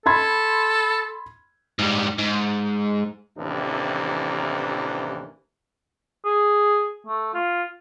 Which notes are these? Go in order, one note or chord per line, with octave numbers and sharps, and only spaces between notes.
A4 B5 C6 G#6
G#2 G3
G#2
A1 D#2 C3 E3 D4
G#4
A3
F4